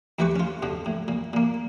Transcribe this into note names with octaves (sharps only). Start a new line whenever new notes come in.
D2 D#3 E3 G4 B4 C#6
C#4 F4
F2 B2 D3
A2
A#2
A#2 A#3